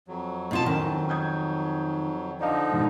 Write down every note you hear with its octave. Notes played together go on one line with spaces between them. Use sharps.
F2 F#3
B2 F4 A5
D#3 C#4
D#6 G6 G#6
D3 F3 D#4 D5 F5
G#2 B2 D#3